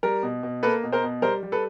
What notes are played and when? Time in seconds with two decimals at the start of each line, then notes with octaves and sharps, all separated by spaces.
0.03 G3 A#4
0.23 B2
0.43 B2
0.63 A#3 A4 B4
0.83 B2
0.92 A#4 C5
1.03 B2
1.22 G3 A#4 C5
1.43 G3
1.52 A4 B4